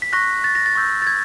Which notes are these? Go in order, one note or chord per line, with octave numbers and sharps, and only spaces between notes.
B6
C#6 F#6 A#6
A6
A#6
A6
C#6 E6 G6
A6
G#6